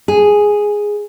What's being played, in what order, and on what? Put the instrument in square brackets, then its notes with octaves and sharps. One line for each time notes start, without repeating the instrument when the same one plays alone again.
[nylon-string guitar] G#4